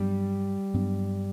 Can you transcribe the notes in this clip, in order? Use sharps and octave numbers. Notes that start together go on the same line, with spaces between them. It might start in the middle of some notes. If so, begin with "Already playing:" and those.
Already playing: G2 F#3 G3 B3 D4
G2 F#3 B3 D4